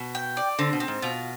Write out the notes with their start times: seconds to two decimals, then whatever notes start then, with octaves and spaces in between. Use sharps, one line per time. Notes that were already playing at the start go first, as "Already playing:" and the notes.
Already playing: B2
0.15 G5
0.37 D5
0.59 D3 C4
0.73 B2
0.80 C4
0.88 G#2
1.02 B2 F4